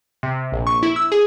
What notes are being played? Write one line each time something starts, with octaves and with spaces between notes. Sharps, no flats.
C3
A#1
C#6
E4
E6
G#4